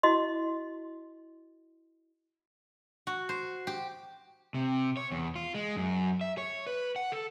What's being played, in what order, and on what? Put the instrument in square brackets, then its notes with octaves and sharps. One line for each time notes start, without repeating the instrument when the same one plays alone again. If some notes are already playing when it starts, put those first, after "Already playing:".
[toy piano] E4 F#4 D#5 C6
[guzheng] F#4
C5
G4
[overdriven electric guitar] C3
C#5
E2
F4
G#3
F#2
E5
C#5
B4
F#5
A4